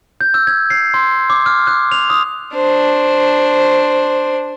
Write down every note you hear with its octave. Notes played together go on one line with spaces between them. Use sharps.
G6
E6
G#6
C7
C6
D6
F6
F#6
F7
D#6
D4 C5